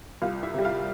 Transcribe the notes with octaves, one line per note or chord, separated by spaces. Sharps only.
C2 F4 F5
E4 E5
C3 G3
F4 F5